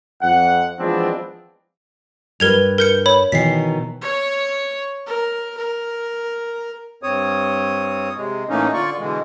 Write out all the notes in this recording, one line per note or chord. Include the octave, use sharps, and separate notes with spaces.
F2 F#5
E3 F3 G#3 B3 C4 D4
G2 A#4 B4 G#6 F7
A#4 G6 C#7
C#5 B5
B2 D#3 E3 B6 C7
C#5
A#4
A#4
G2 C4 C#5 D#6
C3 G#3
A2 E3 A3 A#3 C#4 D#4
D3 F4 D5 C#6
B2 D3 E3 G#3